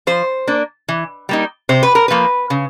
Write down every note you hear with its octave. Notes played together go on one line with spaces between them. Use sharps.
F3 C5
A#3 D4
E3
G3 A#3 D#4
C3 C5
B4
A#4
F3 A#3 B4
C#3